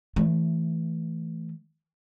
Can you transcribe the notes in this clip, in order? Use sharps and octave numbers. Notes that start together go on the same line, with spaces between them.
E3 A3